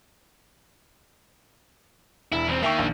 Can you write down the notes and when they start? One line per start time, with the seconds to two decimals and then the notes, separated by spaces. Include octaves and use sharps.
2.32 E1 E4
2.48 E2 C4
2.63 D#3 A#3 E5 G5 C#6
2.79 A#1